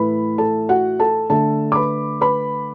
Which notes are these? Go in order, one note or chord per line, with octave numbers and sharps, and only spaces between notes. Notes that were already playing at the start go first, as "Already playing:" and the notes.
Already playing: A2 E3 A3 B4 B5
A4 A5
F#4 F#5
A4 A5
D3 A3 A4 A5
D6
B4 B5
B4 B5